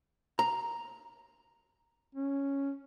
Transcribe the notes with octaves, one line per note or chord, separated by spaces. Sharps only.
A#5
C#4